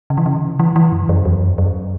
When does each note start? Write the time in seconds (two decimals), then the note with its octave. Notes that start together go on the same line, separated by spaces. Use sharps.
0.10 C#3
0.18 E3
0.26 C#3
0.59 E3
0.76 E3
0.92 F#2
1.09 F#2
1.25 E2
1.41 F#2
1.58 F#2